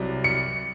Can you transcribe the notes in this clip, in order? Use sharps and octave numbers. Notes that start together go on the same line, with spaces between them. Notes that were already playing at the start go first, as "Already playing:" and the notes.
Already playing: C2 C3 F#3
C#7